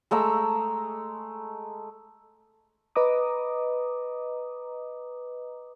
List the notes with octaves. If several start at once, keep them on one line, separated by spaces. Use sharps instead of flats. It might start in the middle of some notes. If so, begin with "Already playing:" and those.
G#3 A3 A#5 E6
B4 D#5 A#5 D6 D#6